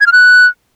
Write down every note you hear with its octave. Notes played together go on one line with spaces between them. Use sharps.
G#6
F6
F#6